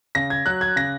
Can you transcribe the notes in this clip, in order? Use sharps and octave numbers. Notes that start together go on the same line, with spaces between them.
C#3 A#6
G#6
F#3 F#6
G#6
C#3 A#6